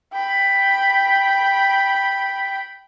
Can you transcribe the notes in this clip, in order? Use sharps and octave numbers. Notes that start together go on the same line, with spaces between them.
G5 B5